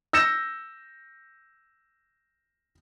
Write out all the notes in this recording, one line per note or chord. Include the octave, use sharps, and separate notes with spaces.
E6 G6 A#6 C#7 E7